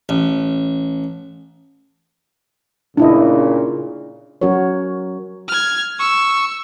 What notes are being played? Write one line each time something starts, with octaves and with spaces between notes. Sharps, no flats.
A1
A#2 C#3 D4 E4 D#5
F#3 C#4 F#4 A#4 C#5
F6 G#6
C#6 E6